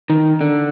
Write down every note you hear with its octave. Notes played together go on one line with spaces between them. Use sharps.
D#3
D3